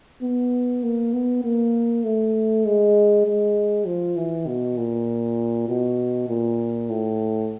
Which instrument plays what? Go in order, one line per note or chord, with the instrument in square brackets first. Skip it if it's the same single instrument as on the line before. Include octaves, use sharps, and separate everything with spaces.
[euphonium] B3
A#3
B3
A#3
A3
G#3
G#3
F3
E3
B2
A#2
B2
A#2
A2